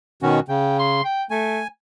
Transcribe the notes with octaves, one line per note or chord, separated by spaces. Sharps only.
B2 D#3 C#4 F#4
C#3 G5
C6
G5
A3 G#5